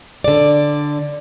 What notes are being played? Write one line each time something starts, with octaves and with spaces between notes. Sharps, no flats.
D3 D5